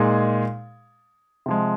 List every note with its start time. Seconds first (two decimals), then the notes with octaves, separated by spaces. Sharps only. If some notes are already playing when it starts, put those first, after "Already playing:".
Already playing: A#2 G#3 D#4 G#4
1.46 C3 F3 G#3